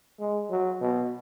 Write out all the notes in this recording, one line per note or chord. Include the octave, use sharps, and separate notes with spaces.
G#3
F#3
B2